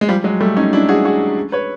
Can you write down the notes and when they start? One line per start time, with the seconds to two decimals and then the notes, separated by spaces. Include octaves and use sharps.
0.01 G#3
0.08 F3 G3
0.24 F#3 G#3
0.41 G3 A3
0.57 C#4 D#4
0.73 D4 E4
0.89 F#4 G#4
1.05 F#4 G#4
1.52 B4 C#5